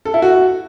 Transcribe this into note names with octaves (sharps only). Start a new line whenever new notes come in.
A4
E4
F#4